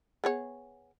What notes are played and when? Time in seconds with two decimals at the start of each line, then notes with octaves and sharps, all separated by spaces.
0.24 B3 G#4 C#5